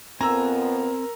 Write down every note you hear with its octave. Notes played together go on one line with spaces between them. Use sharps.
F2 B3 C4 A#4 G#5 A#5 E6